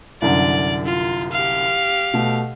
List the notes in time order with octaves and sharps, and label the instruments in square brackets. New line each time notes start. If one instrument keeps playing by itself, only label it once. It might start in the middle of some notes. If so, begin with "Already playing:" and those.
[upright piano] C2 F#2 D3 [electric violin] D5
[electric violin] F4
G4 F5
[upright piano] B2 A3